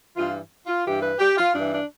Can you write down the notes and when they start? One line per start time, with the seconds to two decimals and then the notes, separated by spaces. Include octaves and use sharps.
0.15 G2 E3 F4
0.67 F4
0.84 G2 E3 G4
1.01 B4
1.19 G4
1.37 F4
1.54 G2 E3 D4
1.71 D4